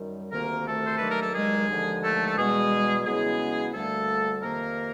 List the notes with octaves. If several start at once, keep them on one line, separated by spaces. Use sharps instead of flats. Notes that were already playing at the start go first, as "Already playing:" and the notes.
Already playing: F#2 D#3 G3
D2 C3 D#3 A#3 A#4
A3 A4
C5
G2 D#3 F#3 A#3 B4
A#4
A4
G#3 G#4
D#2 D3 F3 G#3
A3 A4
A4
E2 B2 G3 G#3 B3 G#4
E2 C#3 F#3 G#3 B3 E4 G#4
D2 D3 G3 A3 A#3 A4
F2 C3 D#3 A#3 A#4